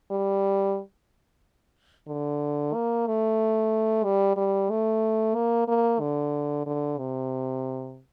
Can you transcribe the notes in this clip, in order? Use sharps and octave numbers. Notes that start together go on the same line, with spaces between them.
G3
D3
A#3
A3
G3
G3
A3
A#3
A#3
D3
D3
C3